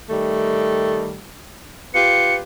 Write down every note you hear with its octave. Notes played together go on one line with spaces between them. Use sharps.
D#3 G3 A3
F4 G4 B4 C#7